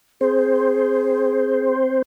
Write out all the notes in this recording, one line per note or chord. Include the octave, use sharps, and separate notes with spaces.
C4 G#4 C5